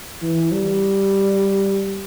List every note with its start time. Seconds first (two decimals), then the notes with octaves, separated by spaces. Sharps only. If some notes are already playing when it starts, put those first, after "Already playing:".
0.22 E3
0.52 G3